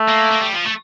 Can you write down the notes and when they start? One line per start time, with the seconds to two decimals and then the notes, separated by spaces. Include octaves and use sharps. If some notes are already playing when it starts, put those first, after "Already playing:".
Already playing: A3
0.09 A#3
0.31 A#3
0.42 G3
0.53 F3
0.66 A3